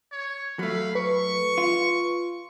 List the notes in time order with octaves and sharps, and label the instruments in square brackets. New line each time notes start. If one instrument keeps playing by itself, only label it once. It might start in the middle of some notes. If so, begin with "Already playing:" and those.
[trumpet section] C#5
[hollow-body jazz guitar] F#3 A3 [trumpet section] F5 B5
[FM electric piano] B4 [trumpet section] C#6
[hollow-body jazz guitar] F4